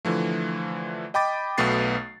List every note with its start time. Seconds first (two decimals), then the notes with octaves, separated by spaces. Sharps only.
0.05 D3 E3 F3 A3
1.14 D#5 G5 B5 D6 A6
1.58 B1 B2 A3 B3 A6 C7